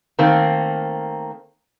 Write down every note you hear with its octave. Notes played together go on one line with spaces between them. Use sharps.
D#3 A3 A#3 C4